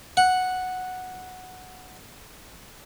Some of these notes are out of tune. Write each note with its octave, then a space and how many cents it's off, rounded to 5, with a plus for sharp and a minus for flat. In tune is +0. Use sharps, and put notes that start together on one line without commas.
F#5 -5